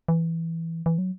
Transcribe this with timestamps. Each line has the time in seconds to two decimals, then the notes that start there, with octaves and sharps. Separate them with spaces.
0.08 E3
0.86 E3
0.98 F#3